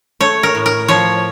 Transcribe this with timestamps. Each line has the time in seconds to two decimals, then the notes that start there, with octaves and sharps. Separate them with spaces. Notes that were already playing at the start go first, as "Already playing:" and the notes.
0.21 A3 C#5
0.43 A#4
0.55 A2
0.66 A#4
0.88 F3 C#5